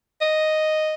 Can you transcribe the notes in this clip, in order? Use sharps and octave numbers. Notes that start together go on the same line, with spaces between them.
D#5